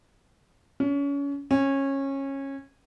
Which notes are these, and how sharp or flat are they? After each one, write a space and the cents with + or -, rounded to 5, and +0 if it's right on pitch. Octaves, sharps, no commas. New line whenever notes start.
C#4 +30
C#4 -20